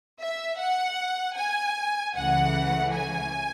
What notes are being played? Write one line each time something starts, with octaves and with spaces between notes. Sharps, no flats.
E5
F#5
G#5
C#2 C#3 E3 A3 F#5
G#5